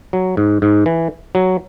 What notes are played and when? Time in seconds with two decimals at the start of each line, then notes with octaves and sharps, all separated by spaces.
0.13 F#3
0.37 G#2
0.62 G#2
0.86 E3
1.35 F#3